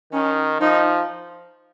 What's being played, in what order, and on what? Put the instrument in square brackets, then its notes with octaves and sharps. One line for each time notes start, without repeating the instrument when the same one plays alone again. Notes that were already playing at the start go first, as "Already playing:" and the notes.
[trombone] D#3 [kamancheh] C#4
[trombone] F3 [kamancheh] D#4